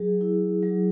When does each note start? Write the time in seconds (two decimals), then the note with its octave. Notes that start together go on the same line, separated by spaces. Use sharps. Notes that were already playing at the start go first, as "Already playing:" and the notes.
Already playing: F#3 G#4
0.21 E4
0.63 F#3